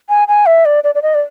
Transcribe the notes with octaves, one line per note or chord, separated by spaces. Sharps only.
G#5
G#5
E5
D5
D5
D5
D#5
D5